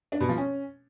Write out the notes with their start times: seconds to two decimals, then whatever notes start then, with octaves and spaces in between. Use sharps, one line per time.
0.12 D4
0.20 B2
0.29 F3
0.37 C#4